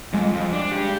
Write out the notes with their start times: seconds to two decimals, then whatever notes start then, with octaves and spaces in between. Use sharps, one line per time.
0.13 F2 G#3
0.33 F2
0.53 D4
0.72 G4